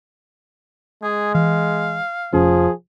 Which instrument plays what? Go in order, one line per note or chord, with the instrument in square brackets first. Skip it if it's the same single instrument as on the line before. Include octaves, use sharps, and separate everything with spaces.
[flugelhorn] G#3 [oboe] G#4
[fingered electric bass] E3 [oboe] F5
[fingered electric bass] F1 C#4 [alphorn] F3 [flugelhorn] G#4